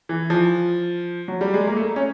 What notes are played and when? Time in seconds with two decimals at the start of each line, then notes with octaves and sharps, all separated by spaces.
0.09 E3
0.30 F3
1.28 F#3
1.41 G3
1.54 G#3
1.67 A#3
1.77 A3
1.96 C#4